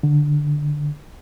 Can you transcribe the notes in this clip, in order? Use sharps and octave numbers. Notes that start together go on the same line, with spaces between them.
D3